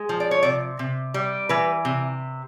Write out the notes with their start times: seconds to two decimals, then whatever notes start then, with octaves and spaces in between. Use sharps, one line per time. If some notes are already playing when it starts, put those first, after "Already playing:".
Already playing: G#3
0.09 F3
0.20 D5
0.31 C#5
0.43 C3 D5
0.79 C3
1.14 G3
1.49 E3 B4
1.85 C3